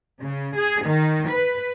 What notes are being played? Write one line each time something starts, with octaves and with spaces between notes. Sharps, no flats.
C#3
G#4
D#3
B4